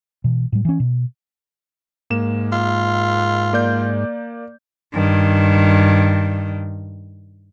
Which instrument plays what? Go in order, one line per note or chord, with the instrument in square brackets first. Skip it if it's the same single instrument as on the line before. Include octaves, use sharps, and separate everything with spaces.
[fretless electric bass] B2 E3
A2 G3
E3 C#4
B2
[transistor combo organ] G#2 [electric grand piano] A#3 E7
[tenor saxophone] F4
[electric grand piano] A#3 D5 G6
[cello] G2 D#3